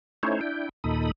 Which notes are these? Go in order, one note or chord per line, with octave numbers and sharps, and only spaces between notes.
A3 C#4 D#4 E4 C5 C#5
D4 E4 G5
D#2 A#2 D#4 A4 B5 D#6